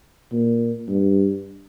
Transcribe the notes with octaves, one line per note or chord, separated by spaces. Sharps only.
A#2
G2